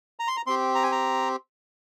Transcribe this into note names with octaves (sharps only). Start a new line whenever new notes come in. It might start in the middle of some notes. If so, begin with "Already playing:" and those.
A#5
C6
A#5
C4 G4 C6
A#5
G#5
A#5